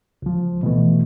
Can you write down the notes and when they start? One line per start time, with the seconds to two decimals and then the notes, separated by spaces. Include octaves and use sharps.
0.22 C#2 F3
0.63 B2 E3 A3